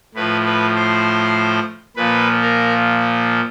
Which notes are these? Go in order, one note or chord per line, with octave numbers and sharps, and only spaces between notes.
A2 F3 B4
B4
C5
A#2 F3 B4
A#4